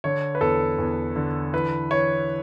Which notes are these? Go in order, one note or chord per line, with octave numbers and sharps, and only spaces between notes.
D3 C#5
B4
E2 A4
E2
D3
E3 B4
E3 C#5